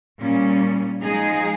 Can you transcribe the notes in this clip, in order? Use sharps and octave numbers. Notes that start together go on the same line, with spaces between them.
A#2 G3 C#4
F3 G#3 D#4 G#4